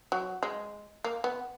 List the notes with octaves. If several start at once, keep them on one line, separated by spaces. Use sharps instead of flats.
F#3
G#3
A#3
B3